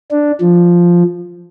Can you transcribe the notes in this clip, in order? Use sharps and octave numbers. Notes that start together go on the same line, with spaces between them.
D4
F3